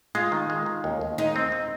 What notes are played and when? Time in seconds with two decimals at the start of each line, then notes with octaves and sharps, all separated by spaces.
0.15 G#3 F4
0.32 D#3
0.50 G#3
0.66 D#3
0.84 D#2
1.01 D#2
1.18 G#3 D#4
1.36 C4
1.52 C4